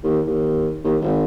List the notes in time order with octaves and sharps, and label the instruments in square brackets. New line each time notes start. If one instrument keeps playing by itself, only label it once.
[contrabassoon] D#2
D#2
D#2
G#1